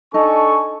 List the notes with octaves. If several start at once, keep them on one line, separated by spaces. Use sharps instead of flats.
D4 D#4 A4 G#5 C#6